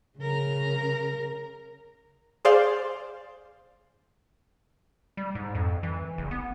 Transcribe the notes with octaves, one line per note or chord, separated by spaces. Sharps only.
C#3 A#4
G#4 C5 D5 F5 C6
G3
G#2
F2
E3
F#1
B3